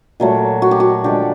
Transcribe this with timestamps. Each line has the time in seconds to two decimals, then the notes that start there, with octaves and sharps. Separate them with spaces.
0.20 A#2 F#3 A3
0.62 F#4
0.71 G4
0.80 F#4
1.04 D3 F3 G#3 G4